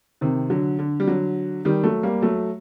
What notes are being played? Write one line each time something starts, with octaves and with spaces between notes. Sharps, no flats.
C3 D#3
D3 F#3
D3
G3
D3 F#3
D#3 G3
F#3 A3
G3 A#3
F#3 A3